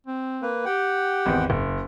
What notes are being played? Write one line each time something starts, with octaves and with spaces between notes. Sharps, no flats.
C4
A#3 B4
G4 F#5 G5
G#1 E2
F#1